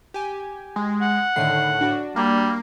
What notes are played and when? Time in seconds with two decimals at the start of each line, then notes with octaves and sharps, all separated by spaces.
0.14 G4 G#5
0.76 G#3
1.02 F#5
1.36 A2 D3 D#3 C7
1.81 D4 F#4
2.16 G3 A#3